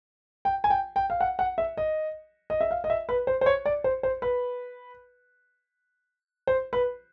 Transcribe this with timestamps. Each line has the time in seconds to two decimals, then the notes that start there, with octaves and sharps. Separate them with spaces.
0.45 G5
0.64 G#5
0.70 G5
0.96 G5
1.10 F5
1.21 F#5
1.39 F#5
1.58 E5
1.77 D#5
2.50 D#5
2.61 E5
2.71 F5
2.84 D#5
2.90 E5
3.09 B4
3.27 C5
3.41 C5
3.46 C#5
3.65 D5
3.84 C5
4.03 C5
4.22 B4
6.47 C5
6.73 B4